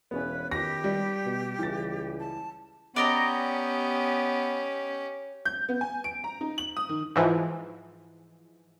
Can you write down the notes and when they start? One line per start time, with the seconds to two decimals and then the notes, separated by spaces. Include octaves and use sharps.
0.11 E1 B3 C#4 B4
0.51 D#3 G4 A#6
0.84 G3
1.26 B2
1.59 C#2 E3 A6
2.19 A5
2.96 B3 C#4 G4 D5 D#5 A#5
5.45 G6
5.69 B3
5.81 G#5
6.04 D7
6.24 A#5
6.41 D#4
6.58 F#7
6.77 D#6
6.89 D#3
7.16 G#2 E3 F3